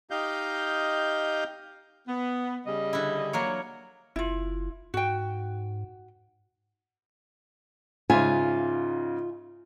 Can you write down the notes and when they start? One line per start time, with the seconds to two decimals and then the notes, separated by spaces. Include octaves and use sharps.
0.11 D#4 G4 D#5 F5 G6
2.08 B3
2.66 C#3 G3 D#5
2.93 D3 E4
3.33 F#3 A#3 C#5
4.16 F#1 E4 F4
4.94 G#2 F#4 G5
8.10 G#2 C#3 F4 E5 G#5